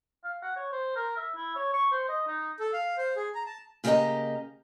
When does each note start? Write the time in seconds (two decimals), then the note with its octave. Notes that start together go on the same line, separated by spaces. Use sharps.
0.24 F5
0.43 F#5
0.56 C#5
0.72 C5
0.96 A#4
1.17 E5
1.36 E4
1.56 C#5
1.73 C#6
1.92 C5
2.09 D#5
2.27 D#4
2.60 A4
2.73 F5
2.97 C5
3.16 G#4
3.35 A#5
3.46 A5
3.84 C#3 A#3 G4 A4 D#5 A#5